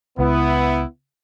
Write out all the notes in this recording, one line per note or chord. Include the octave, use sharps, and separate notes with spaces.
C#2 B3 E4